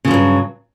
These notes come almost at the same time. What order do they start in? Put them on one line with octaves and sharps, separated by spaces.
C#3 F3 G2 F#3